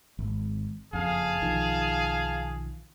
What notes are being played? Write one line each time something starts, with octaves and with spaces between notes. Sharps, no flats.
G#1
F#1 F2 G#4 F5 A5
B1 D#3 F3